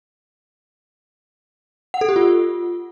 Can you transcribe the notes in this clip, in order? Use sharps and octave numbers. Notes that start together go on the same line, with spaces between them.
F#5
A4
G4
F4